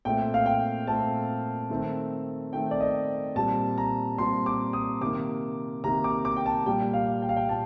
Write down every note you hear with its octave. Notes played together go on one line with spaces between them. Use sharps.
A#2 A3 C4 G5
F5
G5
A#2 A3 C4 A5
D#3 A3 C4
D#3 A3 C4 G5
D5
D#5
A#2 G3 C4 A5
A#5
A#2 G3 C4 C6
D6
D#6
C3 D#3 A#3 D6
C3 D#3 A#3 A#5
D6
D6
G5
A5
A#2 G3 A#3 G5
F5
G5
F5
G5
A#2 A5